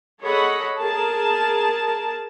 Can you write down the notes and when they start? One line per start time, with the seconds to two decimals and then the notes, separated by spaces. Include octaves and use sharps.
0.21 G#4 A4 C#5 D#5 F#5 B5
0.80 G#4 A#4 A5